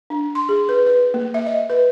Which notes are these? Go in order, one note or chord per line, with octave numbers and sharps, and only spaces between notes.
D4
C6
G#4
B4
B4
A#3
E5
D#5
B4